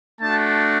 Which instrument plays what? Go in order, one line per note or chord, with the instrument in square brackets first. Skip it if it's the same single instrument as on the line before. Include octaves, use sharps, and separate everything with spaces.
[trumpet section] A3 D4 F#4 A5